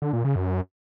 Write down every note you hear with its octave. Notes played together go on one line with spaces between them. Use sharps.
D3
A#2
C#3
F#2